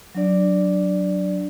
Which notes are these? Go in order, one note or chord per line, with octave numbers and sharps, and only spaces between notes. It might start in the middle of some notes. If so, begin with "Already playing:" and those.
F#3 D4 D5